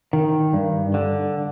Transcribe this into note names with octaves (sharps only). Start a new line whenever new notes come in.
D#3
G2
D3